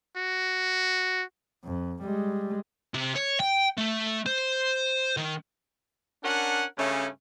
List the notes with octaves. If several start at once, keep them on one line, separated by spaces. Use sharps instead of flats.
F#4
F2
G3 G#3
C3
C#5
G5
A3
C5
D#3
C#4 D4 A#4 F#5
G2 C#3 A3 C#4